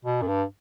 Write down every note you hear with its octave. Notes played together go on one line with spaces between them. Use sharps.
B2
F#2
G2